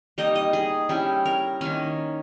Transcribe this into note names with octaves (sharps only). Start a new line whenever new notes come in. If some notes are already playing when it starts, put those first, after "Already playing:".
G3 A#3 D#4 D#5
D#5
G#4
G3 C#4 E4
A#4
D#3 A#3 C#4